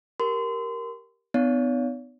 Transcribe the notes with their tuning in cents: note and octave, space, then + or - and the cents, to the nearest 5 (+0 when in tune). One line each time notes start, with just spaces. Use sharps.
G4 +0 A#4 +0 C6 -30
B3 +30 D#4 -35 C#5 +45